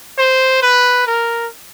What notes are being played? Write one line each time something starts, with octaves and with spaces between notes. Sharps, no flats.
C5
B4
A#4